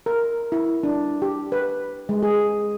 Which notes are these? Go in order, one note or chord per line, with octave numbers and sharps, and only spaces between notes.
A#4
E4
D4
G4
B4
G#3
G#4